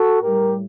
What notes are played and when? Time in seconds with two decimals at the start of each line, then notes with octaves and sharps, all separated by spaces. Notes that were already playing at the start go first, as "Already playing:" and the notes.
Already playing: F#4 A4
0.22 A2 G3 G4 A#4